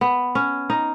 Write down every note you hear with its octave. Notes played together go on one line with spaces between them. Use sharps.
B3
C#4
D#4